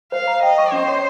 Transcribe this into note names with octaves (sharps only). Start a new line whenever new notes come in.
C5 F5
A#5
D#5 G5
C#6
C#4 C5
C#5